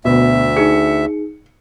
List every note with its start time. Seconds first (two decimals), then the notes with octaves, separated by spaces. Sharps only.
0.05 D2 B2 E5
0.57 D#4 G#4 C#7